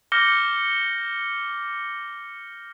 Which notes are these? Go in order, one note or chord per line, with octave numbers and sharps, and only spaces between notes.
D6 F6 G6 A#6 C#7 G7